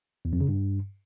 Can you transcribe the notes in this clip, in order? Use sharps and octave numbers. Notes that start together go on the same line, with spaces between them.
E2
F2
C#3
G2